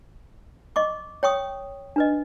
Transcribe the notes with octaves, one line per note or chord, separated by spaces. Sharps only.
D#5 C#6 D6
C#5 G5 C#6 D#6
D4 B4 D#5